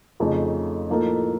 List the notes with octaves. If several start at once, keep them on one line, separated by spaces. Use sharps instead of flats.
F2 C#3 A3 D#4
A2 F3 A#3 D#4 A4